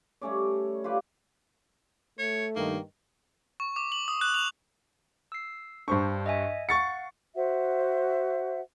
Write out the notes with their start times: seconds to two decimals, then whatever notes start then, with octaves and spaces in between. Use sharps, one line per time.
0.21 G3 A3 C#4 D5
0.84 F4 G4 B4 D5
2.19 A3 C#5
2.56 G2 D#3 A#3
3.60 C#6
3.76 D6
3.92 F#7
4.08 D#6
4.21 F#6
4.34 F7
5.32 E6 C7
5.88 G2 D4 C5 C#6
6.26 D#5 E5 G#5
6.69 F5 F#5 C#6 A6 C#7
7.36 F#4 C5 E5 F#5